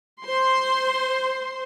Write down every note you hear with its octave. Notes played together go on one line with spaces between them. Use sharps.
C5 C6